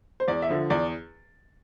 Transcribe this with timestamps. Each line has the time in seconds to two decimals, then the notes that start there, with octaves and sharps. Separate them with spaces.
0.20 C5
0.28 E2 D5
0.42 E5
0.49 D3 F3
0.70 E2 D5